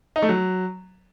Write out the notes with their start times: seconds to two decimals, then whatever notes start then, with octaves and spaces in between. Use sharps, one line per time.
0.16 D#4
0.22 A3
0.29 F#3